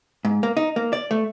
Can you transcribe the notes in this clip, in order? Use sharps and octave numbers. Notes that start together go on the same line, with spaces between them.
G#2
A#3
D#4
A#3
D5
A3